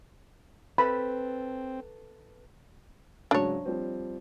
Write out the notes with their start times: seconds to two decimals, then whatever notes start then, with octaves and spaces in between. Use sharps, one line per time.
0.78 C4 A4 B4 B5
3.31 G#2 C#3 F#3 D4 C#5
3.66 F3 G3 C4